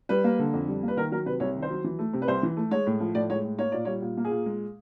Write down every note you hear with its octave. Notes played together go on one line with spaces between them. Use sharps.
G3 B4
A#3
D3
F2
G3
A#3
B4
D#3 A#4
F#3 A#4
C3 B4
C2 C#5
D#3
C5
F#3
E3
A3
C3
B4
C2 C5
E3
A3
G#3 C#5
A2
F3
A2 D5
G#3 C#5
A2
A#3 C#5
A#2 D5
G3 C#5
A#2
A#3
G#4
A#2
G#3